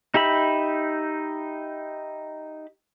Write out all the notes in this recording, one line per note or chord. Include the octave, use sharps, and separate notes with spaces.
D#4 G4 E5 B5